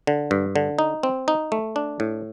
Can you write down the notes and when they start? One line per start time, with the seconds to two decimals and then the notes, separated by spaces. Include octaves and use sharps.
0.07 D3
0.31 G2
0.56 D3
0.79 D#4
1.03 C4
1.28 D#4
1.52 A3
1.76 D4
2.00 A2